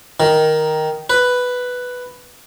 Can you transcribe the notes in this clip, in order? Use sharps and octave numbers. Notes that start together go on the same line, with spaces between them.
D#3
B4